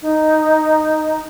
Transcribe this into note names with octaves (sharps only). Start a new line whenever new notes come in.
D#4